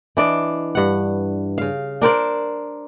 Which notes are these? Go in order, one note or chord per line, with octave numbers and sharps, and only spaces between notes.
E3 D4 D5 D#5
G2 F#5
C#3 F5
D4 A#4 C5 D5